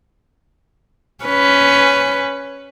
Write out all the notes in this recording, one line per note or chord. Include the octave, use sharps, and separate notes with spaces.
C#4 B4